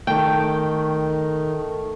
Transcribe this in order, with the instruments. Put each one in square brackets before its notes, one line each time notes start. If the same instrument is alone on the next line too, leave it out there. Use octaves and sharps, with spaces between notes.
[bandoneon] D#3 [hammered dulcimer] A3 D6 [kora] G5